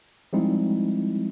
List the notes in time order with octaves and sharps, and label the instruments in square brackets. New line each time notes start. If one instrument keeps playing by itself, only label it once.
[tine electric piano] F3 G3 G#3 C4 D#4 E4